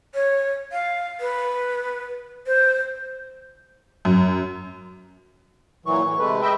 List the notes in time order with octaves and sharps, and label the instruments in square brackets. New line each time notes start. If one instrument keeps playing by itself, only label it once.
[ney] C#5
F5
B4
C5
[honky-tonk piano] F#2
[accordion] A#2 E3 F#3 [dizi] C#6
[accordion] A2 E3
[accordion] C3 A3 [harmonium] G#3 B4
[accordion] D#5 E5 G5 [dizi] B5